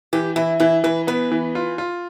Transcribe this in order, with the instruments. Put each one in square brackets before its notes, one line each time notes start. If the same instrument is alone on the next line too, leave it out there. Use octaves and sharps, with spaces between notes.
[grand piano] E3 [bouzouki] G4
[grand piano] E3 [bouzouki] E4
[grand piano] E3 [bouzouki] E4
[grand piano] E3 [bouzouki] B4
[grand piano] B3 [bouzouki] B4
[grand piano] E3
F4
F4